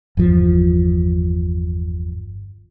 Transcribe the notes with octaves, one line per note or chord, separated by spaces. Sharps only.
G1 E2 F3